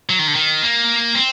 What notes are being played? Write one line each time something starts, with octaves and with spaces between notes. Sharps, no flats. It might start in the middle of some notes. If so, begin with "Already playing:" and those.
F#3
D#3
D3
D#3
A#3
C4